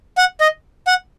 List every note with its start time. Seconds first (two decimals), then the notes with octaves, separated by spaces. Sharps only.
0.18 F#5
0.40 D#5
0.87 F#5